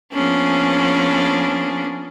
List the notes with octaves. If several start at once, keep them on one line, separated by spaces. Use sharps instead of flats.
F3 A#3 B3 C#4 D4 G#4